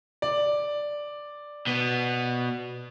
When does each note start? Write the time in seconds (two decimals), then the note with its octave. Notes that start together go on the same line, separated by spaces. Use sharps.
0.22 D5
1.67 B2 B3